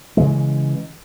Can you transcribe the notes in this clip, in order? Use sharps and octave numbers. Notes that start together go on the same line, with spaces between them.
C#3 E3 G#3